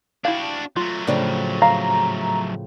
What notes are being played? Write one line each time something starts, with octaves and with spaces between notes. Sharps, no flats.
D4 E4 F#4 G4 F5
F#3 A3 F4
A2 C#3 F3 D4
F5 A#5